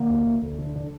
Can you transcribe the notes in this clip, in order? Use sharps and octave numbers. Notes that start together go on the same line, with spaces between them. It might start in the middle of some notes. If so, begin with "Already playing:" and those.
Already playing: D3 A#3
D2
D2
D2
D3
D3